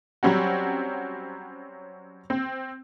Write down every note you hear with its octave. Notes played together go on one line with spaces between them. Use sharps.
F#3 G3 C4 C#4 F#4
C4